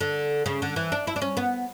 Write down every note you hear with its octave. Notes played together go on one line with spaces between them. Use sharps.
D3
C#3
D3
E3
D4
E4
D4
C#4
B3